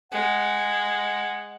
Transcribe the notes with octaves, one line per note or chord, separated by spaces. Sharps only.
G#3 F#5